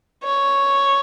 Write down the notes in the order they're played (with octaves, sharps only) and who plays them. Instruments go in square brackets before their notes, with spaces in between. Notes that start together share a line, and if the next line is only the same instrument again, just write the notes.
[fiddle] C#5